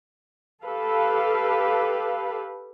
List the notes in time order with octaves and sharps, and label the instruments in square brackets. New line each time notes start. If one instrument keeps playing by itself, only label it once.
[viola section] G4 A4 B4 F5